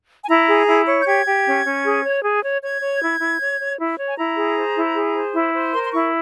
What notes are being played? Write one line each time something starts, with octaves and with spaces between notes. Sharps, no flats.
G#5
E4 A#5
G#4
E4
C#5
G6
G4 G#6
G4
C#4
C#4
G#4
C#5
G#4
C#5
C#5 G#6
C#5
E4
E4
C#5
C#5
E4
C#5
G#5
E4 A#5
G#4
C5
E4
G#4
C5
E4
C5
A#4 C6
C6
E4 C#6